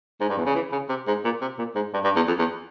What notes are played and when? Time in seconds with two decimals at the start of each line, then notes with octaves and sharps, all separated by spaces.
0.21 G#2
0.29 G2
0.38 E2
0.46 C#3
0.55 E3
0.72 C#3
0.89 C3
1.07 G#2
1.25 A#2
1.41 C3
1.59 A#2
1.76 G#2
1.94 G2
2.04 G2
2.16 E2
2.28 F2
2.39 E2